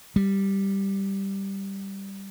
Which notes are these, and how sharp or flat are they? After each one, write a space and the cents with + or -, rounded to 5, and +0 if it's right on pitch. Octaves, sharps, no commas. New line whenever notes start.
G3 +0